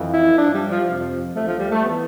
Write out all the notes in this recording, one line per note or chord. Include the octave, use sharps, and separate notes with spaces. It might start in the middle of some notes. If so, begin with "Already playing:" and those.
Already playing: F2 E3
E4
G2 F3 D4
G3
F3
F2 C3 F3
D2 D3 F3 A3
F3
G3
A3
E3 B3